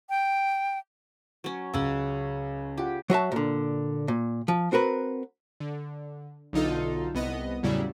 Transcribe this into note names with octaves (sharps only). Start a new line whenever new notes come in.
G5
F#3 C#4
C#2 C#3 C#4 F#5 E6
F4 G4 F#5
F#3 F#4 E5 A5
A#2 D3
A#2
F3
C4 F#4 A#4 B4
D3
B1 D3 D#4 F4 A4
C2 B3 D#5
E2 A2 C#3 F#3 G3 E4